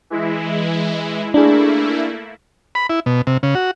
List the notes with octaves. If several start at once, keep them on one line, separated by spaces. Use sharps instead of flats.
E3 G#3 E4
A3 A#3 D4 E4 G#4
B5
E4
B2
C3
C#3
F#4